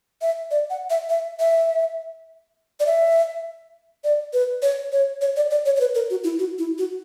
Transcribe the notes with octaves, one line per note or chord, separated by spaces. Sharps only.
E5
D5
F#5
E5
E5
E5
D5
E5
D5
B4
C#5
C#5
C#5
D5
D5
C#5
C#5
B4
A#4
F#4
E4
F#4
E4
F#4